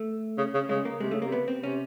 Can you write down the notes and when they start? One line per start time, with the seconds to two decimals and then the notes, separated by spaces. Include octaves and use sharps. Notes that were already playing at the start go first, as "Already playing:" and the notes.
Already playing: A3
0.38 C#3
0.54 C#3
0.69 C#3 G#3
0.85 A#3
1.00 C3 G#3
1.11 A3
1.14 C#3
1.22 A#3
1.27 C3
1.32 B3
1.48 C4
1.63 C3 C#4